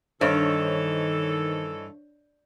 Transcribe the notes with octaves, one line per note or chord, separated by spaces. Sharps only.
G2 D#3 E3 A4 C5 C#5 D#5